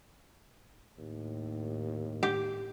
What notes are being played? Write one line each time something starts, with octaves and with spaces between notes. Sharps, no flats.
D#2 A2
G4